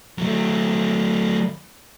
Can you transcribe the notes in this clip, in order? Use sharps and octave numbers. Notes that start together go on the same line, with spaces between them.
F#3 A3